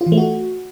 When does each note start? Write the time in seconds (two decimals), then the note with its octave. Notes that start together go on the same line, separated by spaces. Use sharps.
0.01 F4
0.06 E3
0.12 A3
0.18 F#4